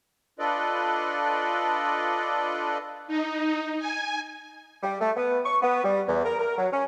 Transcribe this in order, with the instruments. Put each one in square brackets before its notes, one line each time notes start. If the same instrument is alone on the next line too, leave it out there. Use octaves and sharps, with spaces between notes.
[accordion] D4 F4 A4 B4 D5 D#5
[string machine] D#4
G#5
[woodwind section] G3
A3
B3
C#6
B3
G3
E2
A#4
A#4
F#3
C#4